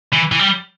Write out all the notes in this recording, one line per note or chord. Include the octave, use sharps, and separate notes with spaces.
E3
E3
G3